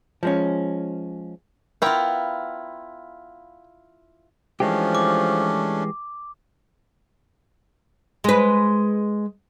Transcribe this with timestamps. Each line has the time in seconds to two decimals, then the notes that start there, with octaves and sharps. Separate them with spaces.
0.23 F3 G#3 C#4
1.82 B3 E4 F4 A#4 G5
4.60 E3 F3 G#3 A3 C#4 D4 G4
4.95 D6
8.24 G#3 B4